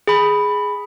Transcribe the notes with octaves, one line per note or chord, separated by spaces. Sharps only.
G#4 B5